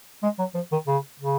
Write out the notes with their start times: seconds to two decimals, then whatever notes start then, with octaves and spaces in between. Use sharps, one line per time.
0.23 G#3
0.39 F#3
0.55 F3
0.72 D#3
0.87 C#3
1.20 C#3